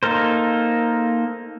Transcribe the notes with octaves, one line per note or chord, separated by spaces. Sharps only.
A#3 D#4 A4 A#4 C5